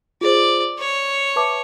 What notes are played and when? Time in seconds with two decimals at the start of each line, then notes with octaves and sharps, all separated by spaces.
0.21 F4 G#4 C5 D5
0.79 C#5
1.36 B4 E5 A5 D6